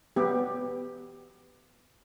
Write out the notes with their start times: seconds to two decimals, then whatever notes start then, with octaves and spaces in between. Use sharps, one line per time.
0.16 B3 G4